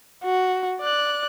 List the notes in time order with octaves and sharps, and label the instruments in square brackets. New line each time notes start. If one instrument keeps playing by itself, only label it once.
[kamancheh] F#4
D5 F#6